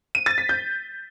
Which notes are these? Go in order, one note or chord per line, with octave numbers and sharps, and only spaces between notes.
D#7
A6
B6
G6